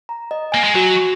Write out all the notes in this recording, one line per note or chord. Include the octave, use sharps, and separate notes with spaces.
A#5
D#5
A#3 G#5
G#3
F#3 F#4